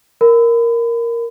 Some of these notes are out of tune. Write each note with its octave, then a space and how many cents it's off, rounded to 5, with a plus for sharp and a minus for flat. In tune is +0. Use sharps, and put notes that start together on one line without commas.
A#4 +0 B5 +30